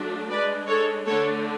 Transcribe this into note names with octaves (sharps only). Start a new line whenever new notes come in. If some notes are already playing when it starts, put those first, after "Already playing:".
Already playing: F#3 A3 D4
G#3 D4 B4 D5
A4 C#5
D3 A3 D4 A4 C#5